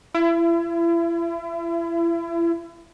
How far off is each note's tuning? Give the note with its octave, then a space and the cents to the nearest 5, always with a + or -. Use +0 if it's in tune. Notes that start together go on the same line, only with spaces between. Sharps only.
E4 +35